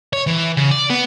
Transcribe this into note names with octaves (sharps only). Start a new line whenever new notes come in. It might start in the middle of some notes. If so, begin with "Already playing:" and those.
C#5
E3
C#3
D5
B3